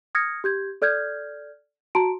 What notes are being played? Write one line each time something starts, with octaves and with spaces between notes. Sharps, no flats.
D#6 F6 G#6 A#6 C#7
G4 G6 G#6
A4 D5 F6 G6 G#6
F#4 A5 A#5 C6 D7